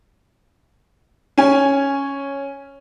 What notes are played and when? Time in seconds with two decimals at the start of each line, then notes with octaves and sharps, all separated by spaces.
1.38 C#4 G#5